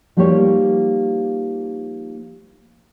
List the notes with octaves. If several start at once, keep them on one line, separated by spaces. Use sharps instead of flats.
F3 G3 A#3 D#4 G4 C#5